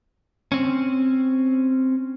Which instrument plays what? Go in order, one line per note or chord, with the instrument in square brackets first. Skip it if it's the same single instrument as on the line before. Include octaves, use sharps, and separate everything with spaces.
[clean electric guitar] C4 C#4